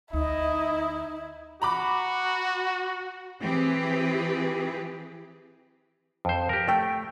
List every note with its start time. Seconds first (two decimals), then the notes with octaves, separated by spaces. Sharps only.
0.13 D2 D#4 E4 D#5
1.62 F#4 A#5 B5 D6
3.41 E3 C4 G4 G#4 B4
6.25 F2 C5
6.49 G4 A#4
6.68 A3 G5